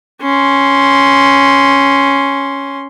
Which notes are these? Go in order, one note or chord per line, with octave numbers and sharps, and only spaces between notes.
C#4 C6